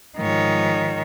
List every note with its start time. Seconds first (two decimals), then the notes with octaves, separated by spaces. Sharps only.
0.19 G#2 D#3 F3 C#5